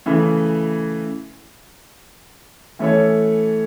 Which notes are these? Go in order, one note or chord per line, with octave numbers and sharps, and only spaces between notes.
C#3 E3 A3
E3 A3 C#4 A4 C#5